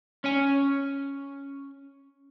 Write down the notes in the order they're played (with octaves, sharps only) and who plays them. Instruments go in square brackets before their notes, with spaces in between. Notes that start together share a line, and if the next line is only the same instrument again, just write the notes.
[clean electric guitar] C#4 C#5 G#5